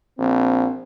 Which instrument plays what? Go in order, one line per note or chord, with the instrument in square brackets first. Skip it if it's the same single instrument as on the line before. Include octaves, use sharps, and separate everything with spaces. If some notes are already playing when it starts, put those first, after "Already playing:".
[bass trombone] A#1 [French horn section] C4